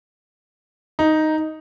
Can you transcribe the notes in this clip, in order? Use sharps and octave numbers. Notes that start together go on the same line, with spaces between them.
D#4